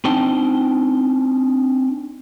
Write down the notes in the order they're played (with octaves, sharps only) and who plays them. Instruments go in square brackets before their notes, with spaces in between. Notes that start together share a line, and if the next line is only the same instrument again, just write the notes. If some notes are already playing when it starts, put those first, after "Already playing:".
[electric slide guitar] C4 D4 D#4 G5 A5